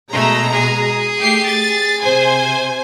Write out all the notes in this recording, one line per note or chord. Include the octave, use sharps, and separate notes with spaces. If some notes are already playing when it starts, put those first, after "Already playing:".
B2 G#3 A3 A#5
G#4
A3 G4 C7
A6
C3 C5 G#5